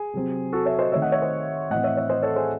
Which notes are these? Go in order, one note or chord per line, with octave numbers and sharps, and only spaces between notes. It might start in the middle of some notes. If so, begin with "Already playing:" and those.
Already playing: G#4
C3 F#3 C4
F#4 A4
C#5 E5
C5 D#5
D#3 A3 C4 C#5 E5
D#5 F#5
C#5 E5
C5 D#5
A2 E3 C4 D#5 F#5
C#5 E5
C#5 E5
C5 D#5
A4 C#5
G#4 C5